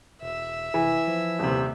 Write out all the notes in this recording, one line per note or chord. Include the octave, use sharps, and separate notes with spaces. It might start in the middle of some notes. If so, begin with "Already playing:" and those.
E1 E5
F1 E3
F3
D#1 C3